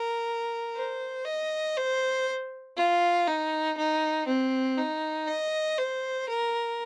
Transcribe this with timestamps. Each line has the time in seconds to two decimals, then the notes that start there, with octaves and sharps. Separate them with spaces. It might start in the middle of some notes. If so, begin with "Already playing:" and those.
Already playing: A#4
0.76 C5
1.26 D#5
1.77 C5
2.78 F4
3.27 D#4
3.78 D#4
4.27 C4
4.78 D#4
5.28 D#5
5.79 C5
6.29 A#4